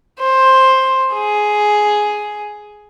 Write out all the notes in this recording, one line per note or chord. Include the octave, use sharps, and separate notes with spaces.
C5
G#4